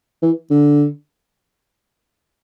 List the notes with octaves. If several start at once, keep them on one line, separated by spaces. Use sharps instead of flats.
E3
D3